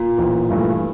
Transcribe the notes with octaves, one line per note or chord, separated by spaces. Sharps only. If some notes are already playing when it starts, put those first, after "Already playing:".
Already playing: A#2
A1
G2 E3 A3